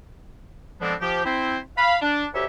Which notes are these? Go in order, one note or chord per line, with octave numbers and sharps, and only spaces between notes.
D3 F3 G#3 B3 C4 D4
F3 G4
C4 E4 C5
F5 B5
D4
D2 G4 C#5 E5